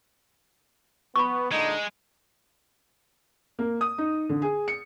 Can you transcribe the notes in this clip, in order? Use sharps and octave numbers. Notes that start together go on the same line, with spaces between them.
B3 B5 C#6
A#2 D3 G#3 D#4
A#3
D#6
D#4
D3
G#4
C#7